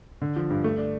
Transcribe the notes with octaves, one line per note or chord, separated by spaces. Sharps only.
D3
F3
G2
A3
D4